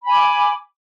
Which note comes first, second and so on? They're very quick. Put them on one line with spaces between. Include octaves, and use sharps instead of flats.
B5 G#5 D6